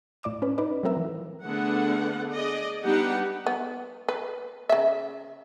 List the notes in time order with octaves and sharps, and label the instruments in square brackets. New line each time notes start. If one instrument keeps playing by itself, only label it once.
[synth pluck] A2 D5 D6 E7
C#4 B4
D#4 B4 D5
F#3 A3 C4 A#4 E5
E3
[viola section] D3 A3 B3 D4 G#4 F#5
G#4 D5 D#5
G3 B3 D4 D#4 G4 F#5
[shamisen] B3
B4
C#3 E5